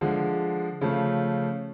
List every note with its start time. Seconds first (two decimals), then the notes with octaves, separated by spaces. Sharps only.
0.01 D3 F3 G#3
0.81 C#3 F3 A3